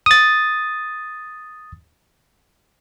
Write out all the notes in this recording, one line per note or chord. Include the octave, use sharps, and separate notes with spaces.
D#6 A6